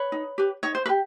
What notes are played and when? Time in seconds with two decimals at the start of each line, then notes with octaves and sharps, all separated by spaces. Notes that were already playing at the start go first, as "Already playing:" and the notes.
Already playing: B4 C#5
0.12 D#4
0.38 G4 B4
0.63 D#4 C#5
0.75 C5
0.86 B4
0.89 G4